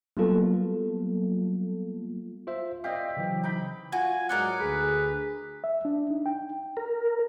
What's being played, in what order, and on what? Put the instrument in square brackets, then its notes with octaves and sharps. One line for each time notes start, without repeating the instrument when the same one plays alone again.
[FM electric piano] F#3 G3 A#3 B3 F4 A4
[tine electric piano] F4 C5 E5
[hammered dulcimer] C4 G4 [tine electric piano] D5 D#5 F5
[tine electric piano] C#3 E3 F#3
[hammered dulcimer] D#4 G5 B5
[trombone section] F4 [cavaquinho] F#4 [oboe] G#5
[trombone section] G#2 F#3 [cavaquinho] A#4 D5 D#5 [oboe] F#5
[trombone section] D2 G#4 [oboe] B4
[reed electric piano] E5
D4
D#4
G5
[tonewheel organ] A#4